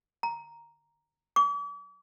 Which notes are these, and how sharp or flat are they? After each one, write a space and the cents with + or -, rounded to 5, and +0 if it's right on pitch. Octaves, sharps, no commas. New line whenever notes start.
A#5 +0
D6 -40